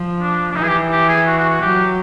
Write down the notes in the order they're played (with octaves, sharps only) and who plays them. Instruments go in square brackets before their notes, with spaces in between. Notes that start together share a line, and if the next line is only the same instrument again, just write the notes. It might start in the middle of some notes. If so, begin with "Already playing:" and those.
Already playing: [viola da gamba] F3
[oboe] D4
D4
[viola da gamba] E3 [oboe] D#4
[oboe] G#4
G4
G4
G#4
F#4
F#4
F#4
[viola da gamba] F#3 [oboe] G4